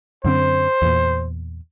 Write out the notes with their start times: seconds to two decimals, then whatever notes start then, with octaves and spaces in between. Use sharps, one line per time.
0.25 F#2 D3 C4 C5
0.82 E2 A#2